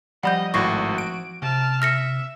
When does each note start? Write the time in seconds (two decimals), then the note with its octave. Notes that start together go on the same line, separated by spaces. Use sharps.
0.23 F3 G3 D5 D#5 F#5 B5 G6
0.54 G#1 A2 F#4 C#6 A#6 C7
0.98 D7
1.42 C3 A5 F6
1.82 E5 F6 A#6 C#7